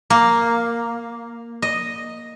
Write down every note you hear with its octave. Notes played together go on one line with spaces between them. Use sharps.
A#3
D#5